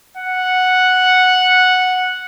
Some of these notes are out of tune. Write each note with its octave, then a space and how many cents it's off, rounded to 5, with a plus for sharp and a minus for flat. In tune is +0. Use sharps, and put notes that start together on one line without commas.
F#5 -5